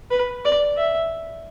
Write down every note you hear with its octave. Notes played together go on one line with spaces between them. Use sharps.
B4
D5
E5